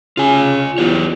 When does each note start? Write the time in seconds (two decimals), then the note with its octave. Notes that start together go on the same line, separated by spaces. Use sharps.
0.17 C#3 F4 G#5
0.78 E2 F4 G4 C#5